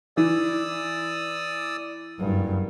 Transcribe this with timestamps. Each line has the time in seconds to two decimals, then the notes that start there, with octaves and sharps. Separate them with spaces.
0.17 E3 D5 D#6 E6
2.19 F#1 G2